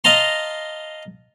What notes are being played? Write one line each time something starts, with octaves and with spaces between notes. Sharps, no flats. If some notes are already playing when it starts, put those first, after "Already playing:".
D#5 F5 A5 A#5 C6